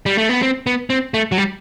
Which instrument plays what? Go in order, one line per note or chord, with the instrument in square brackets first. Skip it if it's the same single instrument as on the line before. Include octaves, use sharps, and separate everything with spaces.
[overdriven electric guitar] G3
A3
B3
C4
B3
C4
A3
F#3
G3